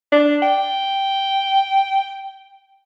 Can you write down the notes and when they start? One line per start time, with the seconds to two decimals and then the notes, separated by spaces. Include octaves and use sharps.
0.12 D4
0.43 G5